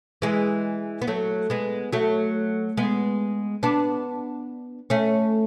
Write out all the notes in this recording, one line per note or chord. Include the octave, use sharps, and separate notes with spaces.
E3 G#3
B3
F#3 A3
G#3 B3
F#3 A3
G#3 B3
B3 D4
A3 C#4